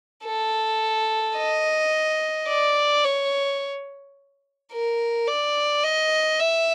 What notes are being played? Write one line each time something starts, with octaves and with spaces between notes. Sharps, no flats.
A4
D#5
D5
C#5
A#4
D5
D#5
E5